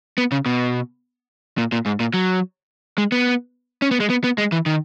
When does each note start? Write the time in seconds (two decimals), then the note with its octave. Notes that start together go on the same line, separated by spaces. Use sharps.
0.18 B3
0.32 C#3
0.46 B2
1.58 A#2
1.72 A#2
1.86 G#2
2.00 A#2
2.14 F#3
2.98 G#3
3.12 B3
3.82 C#4
3.91 B3
4.00 G#3
4.10 B3
4.24 B3
4.38 G#3
4.52 E3
4.66 D#3